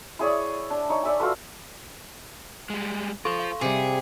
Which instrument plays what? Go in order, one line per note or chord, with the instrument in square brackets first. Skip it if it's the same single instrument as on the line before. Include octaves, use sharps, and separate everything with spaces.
[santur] E4 G#4 C#5 D5
D4
D#4 C#5
D5 E5 G#5
F4 F#4 A4 B4
[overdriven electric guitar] G3 G#3
[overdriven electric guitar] F4 C5 [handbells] A4 C6 C#6
[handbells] F5
[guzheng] C3 G3 [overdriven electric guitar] G#4